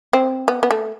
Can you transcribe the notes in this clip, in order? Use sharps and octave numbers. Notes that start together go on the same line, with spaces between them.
C4
B3
B3
A3